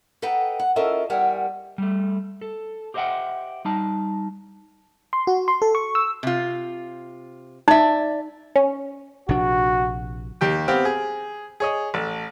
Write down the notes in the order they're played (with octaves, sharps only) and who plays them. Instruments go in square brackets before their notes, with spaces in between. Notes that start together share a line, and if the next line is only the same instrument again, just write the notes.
[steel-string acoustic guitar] A4 B4 D#5 F#5 G5 A#5
F#5
C#4 F4 A4 A#4 D#5 E5
E2 G3 A#4 E5 F#5 G#5
[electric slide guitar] G3 A3
A4
G4 C5 D#5 E5 F#5 G5
G3 D#4 A5
[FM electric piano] C6
F#4
C6
A4
C#6
E6
[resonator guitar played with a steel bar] C3 F4
[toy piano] D#4 [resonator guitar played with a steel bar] D5 E5
[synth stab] C#4
[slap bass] A#1 C3 D4 [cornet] F#4
[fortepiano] D#2 G4 G5
B3 C4 G4 F5 G5
G#4
G#4 C#5 D#5
A1 A4 A5